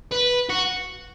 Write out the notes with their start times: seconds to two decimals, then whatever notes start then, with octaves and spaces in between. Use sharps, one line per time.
0.12 B4
0.49 F#4